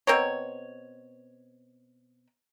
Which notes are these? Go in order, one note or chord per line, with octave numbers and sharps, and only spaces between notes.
B2 C4 A#4 C#5